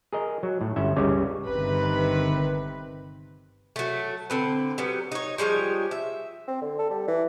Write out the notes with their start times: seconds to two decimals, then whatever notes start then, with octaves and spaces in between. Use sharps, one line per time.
0.13 G#4 A#4 D#5
0.43 F#3
0.61 A2
0.76 G1 C#4 E5
0.96 C#2 C#3 G3 G#3 C#4
1.45 G1 C3 D#3 B4
3.76 F#3 A3
4.30 D3 C4 B4
4.78 F#3 G3 B3
5.12 D#4 C#5
5.38 F3 G3 G#3 C#5
5.91 E5
6.48 C4
6.61 D3
6.79 A4
6.90 G3
7.08 E3